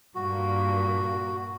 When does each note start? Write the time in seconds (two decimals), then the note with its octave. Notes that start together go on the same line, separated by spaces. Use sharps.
0.15 G2 A#2 A#3 F#4